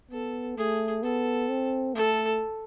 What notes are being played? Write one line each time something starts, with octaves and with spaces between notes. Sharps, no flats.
B3 A4
A3 G#4
B3 A4
C4
A3 A4